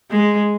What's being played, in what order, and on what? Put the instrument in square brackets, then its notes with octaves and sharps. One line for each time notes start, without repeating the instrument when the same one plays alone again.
[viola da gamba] G#3